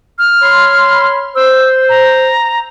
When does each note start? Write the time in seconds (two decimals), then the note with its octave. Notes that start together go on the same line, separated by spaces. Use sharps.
0.19 F6
0.42 C#5 B5 C6
1.35 C5 E6
1.89 A#5